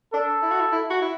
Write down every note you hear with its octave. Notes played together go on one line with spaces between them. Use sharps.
D4 A4
E4
F#4
E4
E4
F#4
E4